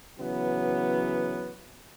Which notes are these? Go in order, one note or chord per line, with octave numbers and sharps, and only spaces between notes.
C#3 E3 F#3 B3